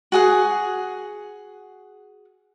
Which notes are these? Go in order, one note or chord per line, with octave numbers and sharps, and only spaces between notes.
F#4 G#4 F#5